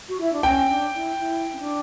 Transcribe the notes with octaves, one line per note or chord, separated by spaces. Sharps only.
F#4
E4
D4
C#4 G5
D4
E4
E4
C#4
D4